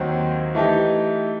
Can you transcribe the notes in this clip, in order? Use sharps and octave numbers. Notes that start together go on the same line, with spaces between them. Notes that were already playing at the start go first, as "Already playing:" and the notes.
Already playing: D#2 D#3 F#3 C4 F#4
E3 A3 D#4 G4